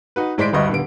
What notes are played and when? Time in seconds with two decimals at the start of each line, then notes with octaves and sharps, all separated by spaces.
0.16 D#4 F#4 B4
0.38 A2 G#3 C5 D5 B6 D7
0.53 G1 D2 G2 D#5 B5 C#6
0.70 D#1 D3 B3 D7